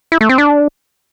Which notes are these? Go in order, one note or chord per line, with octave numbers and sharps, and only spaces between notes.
E4
A3
C4
D4